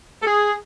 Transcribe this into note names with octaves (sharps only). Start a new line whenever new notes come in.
A4
G#4